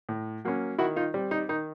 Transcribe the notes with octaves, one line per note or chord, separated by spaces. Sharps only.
A2
F#3 A#3 C#4
D#3 E4 F#4
D#4 F4
G3 C4
D#4
D#3 D#4